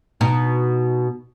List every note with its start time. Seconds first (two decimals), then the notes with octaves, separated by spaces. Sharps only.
0.21 B2 D#4